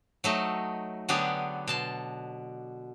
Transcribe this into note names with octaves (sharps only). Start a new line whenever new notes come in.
F#3 A3 D#4
D3 F#3 B3 D4 G4 G#4
B2 A5 C6